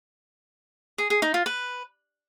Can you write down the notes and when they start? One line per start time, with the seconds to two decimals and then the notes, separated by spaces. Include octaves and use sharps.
0.98 G#4
1.10 G#4
1.22 D#4
1.34 F4
1.46 B4